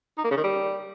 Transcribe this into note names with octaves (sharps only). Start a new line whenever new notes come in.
D#4
A#3
C#3
D#3
G3